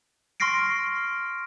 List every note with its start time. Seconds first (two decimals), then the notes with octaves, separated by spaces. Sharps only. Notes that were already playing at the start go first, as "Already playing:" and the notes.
0.40 C6 C#6 F6 A#6 C7 D7